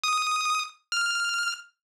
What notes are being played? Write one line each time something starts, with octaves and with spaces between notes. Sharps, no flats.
D#6
F6